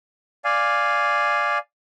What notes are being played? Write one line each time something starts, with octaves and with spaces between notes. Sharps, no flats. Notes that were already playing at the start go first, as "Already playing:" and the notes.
D5 F5 G#5